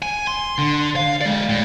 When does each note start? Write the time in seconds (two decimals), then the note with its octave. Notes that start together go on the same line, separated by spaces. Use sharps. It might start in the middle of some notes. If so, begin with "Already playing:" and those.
0.02 G#5
0.27 C6
0.58 D3
0.96 F5
1.21 G#3 D5
1.49 A2